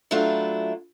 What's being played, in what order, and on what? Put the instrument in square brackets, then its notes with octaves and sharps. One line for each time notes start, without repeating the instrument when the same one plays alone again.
[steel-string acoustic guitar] F#3 A3 D4 E4 F4